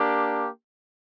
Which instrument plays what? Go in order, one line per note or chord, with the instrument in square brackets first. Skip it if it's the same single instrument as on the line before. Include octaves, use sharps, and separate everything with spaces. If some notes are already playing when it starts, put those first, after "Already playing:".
Already playing: [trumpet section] A#3 D4 G4